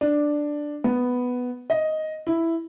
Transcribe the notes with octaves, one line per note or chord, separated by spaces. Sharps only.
D4
B3
D#5
E4